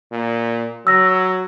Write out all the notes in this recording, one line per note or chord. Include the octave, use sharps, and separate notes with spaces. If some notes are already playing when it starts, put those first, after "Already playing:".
A#2
F#3 E6 A#6